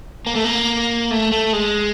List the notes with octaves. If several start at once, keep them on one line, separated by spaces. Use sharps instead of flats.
A#3
A3
A#3
A3
A3
G#3